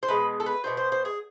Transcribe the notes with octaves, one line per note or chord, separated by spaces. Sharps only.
C5
B2 G#3 B3 B4
A4
B4
B2 G#3 B3 C5
C5
C5
G#4